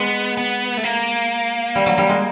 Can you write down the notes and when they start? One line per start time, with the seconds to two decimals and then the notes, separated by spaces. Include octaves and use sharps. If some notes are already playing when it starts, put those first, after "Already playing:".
Already playing: G#3 B3
0.37 B3
0.77 A3
0.84 A#3
1.75 G3
1.86 F#3
1.98 G3
2.09 G#3